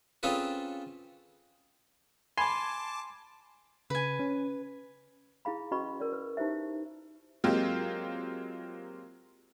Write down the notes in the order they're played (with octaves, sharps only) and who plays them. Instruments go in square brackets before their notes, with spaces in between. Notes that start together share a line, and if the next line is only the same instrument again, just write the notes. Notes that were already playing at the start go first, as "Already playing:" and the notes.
[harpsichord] C4 C#4 F4 G#4 A4 B4
[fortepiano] G#5 [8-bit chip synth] A5 D6 [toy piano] B5 [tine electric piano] C6
[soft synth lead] C#3 [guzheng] B4 G#5
[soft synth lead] C#4
[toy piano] E4 G#4 F5 B5
C#4 F#4 B4 D#5 B5 C#6
A#4 D5
B4
D#4 E4 G4 C5 E5
[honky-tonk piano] F#3 G#3 A#3 C4 F4 G4